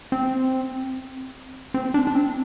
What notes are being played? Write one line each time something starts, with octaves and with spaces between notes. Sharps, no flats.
C4
C4
D4
D4
C4